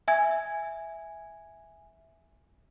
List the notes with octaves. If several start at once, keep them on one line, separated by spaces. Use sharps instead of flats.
E5 G#5 G#6